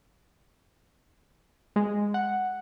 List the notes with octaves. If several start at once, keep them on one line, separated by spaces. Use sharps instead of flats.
G#3
F#5